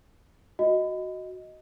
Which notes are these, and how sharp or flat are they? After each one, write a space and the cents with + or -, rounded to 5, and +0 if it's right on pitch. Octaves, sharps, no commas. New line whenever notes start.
F#4 +0 D#5 +5